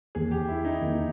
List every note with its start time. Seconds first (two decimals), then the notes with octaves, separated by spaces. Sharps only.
0.15 E2 D#3 A#3 G#4
0.31 G4
0.49 E4
0.65 D#4
0.82 E2 D#3 A#3